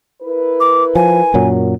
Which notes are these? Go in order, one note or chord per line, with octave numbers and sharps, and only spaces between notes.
E4 A#4 B4
D6
F3 G#5
F#2 A#2 F#3